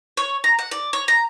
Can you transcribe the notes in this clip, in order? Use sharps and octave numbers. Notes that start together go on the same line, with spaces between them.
C#5
A#5
F#5
D5
C#5
A#5